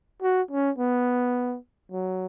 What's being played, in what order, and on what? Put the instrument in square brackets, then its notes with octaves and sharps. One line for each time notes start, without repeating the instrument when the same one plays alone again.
[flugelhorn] F#4
C#4
B3
F#3